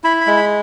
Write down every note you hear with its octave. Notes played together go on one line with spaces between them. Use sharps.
E4 B5
B5
G#3
B5